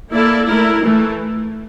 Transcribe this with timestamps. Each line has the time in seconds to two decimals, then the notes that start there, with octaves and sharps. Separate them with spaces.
0.12 A#3 E4 A4 D5
0.47 A3 E4 A#4
0.83 E3 A3